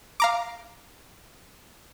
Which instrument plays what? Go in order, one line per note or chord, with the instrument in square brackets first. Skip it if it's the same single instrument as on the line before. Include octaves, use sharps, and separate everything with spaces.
[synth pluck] F5 A#5 D6